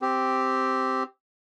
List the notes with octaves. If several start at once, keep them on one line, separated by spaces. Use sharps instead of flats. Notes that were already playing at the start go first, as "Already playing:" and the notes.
C4 G4